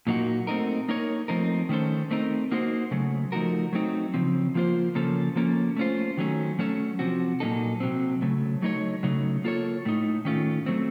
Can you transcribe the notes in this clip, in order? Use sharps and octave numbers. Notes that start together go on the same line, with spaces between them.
A#2 F#3 A#3 D#4 F#4
A3 C4 D#4 A#4
A#3 D#4 A#4 C#5
F3 A3 C4 D#4 A#4
D#3 A3 C#4 A4 C5
A3 C4 D#4 A#4
A#3 D#4 F#4 C5
C#3 F#3 A3
F3 A3 D#4 F#4 A#4
F#3 A3 C4 D#4
C#3 F3 C4
F3 A#3 F4 C5
C#3 F3 A#3 C#4 A4
F3 A#3 C#4 A4
A3 C#4 F4 C5
D#3 F#3 A3 C#4
F#3 A3 C#4 A4 C#5
C3 F3 C4 F#4
A#2 F#3 A#3 D#4 A4
C3 F#3 C4
C#3 F#3 A3
F#3 A3 D#4 A#4 C#5
C#3 F#3 A3 D#4
A#3 F4 A4 C#5
A2 A3 D#4
D#3 A3 C#4 F4
F#3 A3 C4